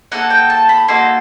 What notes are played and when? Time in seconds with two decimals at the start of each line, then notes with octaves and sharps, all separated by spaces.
0.12 A#3 D#4 F#4 A4 F#5
0.30 G5
0.50 A5
0.69 B5
0.88 A#3 D#4 F#4 A4 C6